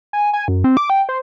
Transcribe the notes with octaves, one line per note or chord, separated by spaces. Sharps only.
G#5
G#5
F#2
C4
D6
G5
C5